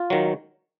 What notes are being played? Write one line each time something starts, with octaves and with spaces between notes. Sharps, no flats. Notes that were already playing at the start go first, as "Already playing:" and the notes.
Already playing: F4
D#3 F#3